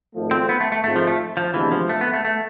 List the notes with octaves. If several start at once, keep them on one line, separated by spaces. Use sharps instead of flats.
G#1 G#2 F3 A3
C4
B3
A3
A3
G#1 G#2 G#3 A3 C4 F4
F3
A3
F3
D2 C3 E3 G#3 B3 D4
F3
A3
B3
A3
A3